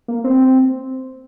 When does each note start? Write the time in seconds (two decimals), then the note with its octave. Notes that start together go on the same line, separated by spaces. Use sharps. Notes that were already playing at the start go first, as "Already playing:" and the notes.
0.08 A#3
0.24 C4